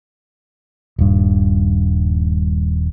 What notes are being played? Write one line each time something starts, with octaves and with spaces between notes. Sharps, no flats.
D#1 G2